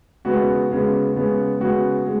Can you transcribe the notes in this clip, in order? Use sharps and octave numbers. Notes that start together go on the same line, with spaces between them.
C#3 G#3 B3 F#4
C#3 G#3 B3
C#3 G#3 B3
C#3 G#3 B3 F#4
G#3